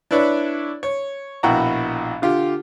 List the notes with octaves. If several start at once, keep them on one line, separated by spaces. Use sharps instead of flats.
D4 E4 B4 C#5 D5
C#5
A#1 B2 E4 F#4 G5 A#5
D3 F4 G4